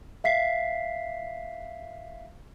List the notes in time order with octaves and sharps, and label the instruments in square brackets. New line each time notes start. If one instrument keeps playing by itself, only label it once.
[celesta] E5 F5 B6 C7